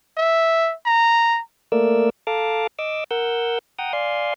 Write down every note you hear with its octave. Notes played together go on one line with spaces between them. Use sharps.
E5
A#5
A3 A#3 A#4 D5 E6
A4 F5 A5 A#5 D6
D#5 D6 E6
A#4 F#5 E6 G6
F#5 G5 A#5 D#6
D5 F5 G#5 C6